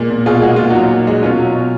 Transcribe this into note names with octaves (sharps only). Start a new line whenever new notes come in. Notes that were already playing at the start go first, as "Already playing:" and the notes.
Already playing: A#2 G#3
A#2
B2 F4 G#4
G#3 F#4
A#2 F4
F#3 D#4 F#4
A#2
G#3
B2 C#4 F4
F#3
B2